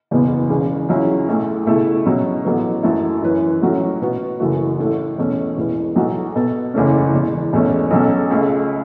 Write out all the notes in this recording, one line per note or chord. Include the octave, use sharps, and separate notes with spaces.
F#1 E2 B2 B3
E1 E2 C#3
C#2 C#3 F#3 C#4 E4
B1 A2 A3
C#2 B2 A3 E4
B2 F#3 C#4
A1 A2 F#3 B3
F#2 F#3 A3 E4 A4
F#2 E3 C#4 E4 B4
A1 A2 F#3 C#4 F#4
B2 B3 F#4
F#1 F#2 E3 A3 F#4
A1 A2 A3
E2 B2 A3 C#4
E1 E2 E3 B3
B1 A2 F#3 A3 F#4
B2 B3 A4
F#1 E2 E3 A3 C#4
E1 E2 E3
E1 E2 B2 A3 C#4
B1 B2 F#3 C#4 A4
C#2 C#3 A3